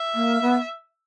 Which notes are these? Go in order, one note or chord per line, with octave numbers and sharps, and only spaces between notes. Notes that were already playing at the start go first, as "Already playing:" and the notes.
Already playing: E5
A#3
B3